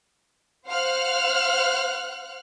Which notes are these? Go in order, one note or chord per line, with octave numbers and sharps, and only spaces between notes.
C5 F5 F#5 F6 F#6